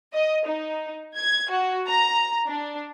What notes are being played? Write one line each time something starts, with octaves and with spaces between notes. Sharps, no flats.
D#5
D#4
G#6
F#4
A#5
D4